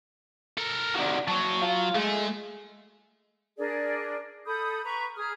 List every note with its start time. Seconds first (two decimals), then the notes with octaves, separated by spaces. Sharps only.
0.58 A4 A#4
0.95 C3 D#3 F#4 D5
1.28 F#3 C#5 A5
1.62 F4
1.95 G#3 A3
3.57 D4 G#4 A#4 D5
4.46 A4 B5 D#6 G6
4.84 B4 A#5 B5 C#6
5.16 G#4 A#5 D#6 F6